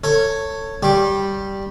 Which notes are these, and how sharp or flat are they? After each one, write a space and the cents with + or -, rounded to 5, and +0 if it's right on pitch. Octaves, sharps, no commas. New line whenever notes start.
A4 +30 C#5 +0
G3 +0 G4 +0 C#6 -40